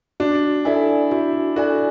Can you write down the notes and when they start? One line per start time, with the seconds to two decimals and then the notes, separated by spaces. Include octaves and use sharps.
0.20 D4 F#4
0.65 E4 A4 D5 G#5
1.11 E4 F#4
1.56 F#4 A4 D5 G#5